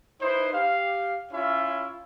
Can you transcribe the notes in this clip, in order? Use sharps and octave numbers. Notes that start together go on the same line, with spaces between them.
D#4 E4 B4 C5
G4 F5
C#4 E4 F4 C#5 E5